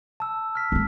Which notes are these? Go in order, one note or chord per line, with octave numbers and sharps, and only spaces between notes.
A5 E6
F6 B6
G#3 A#3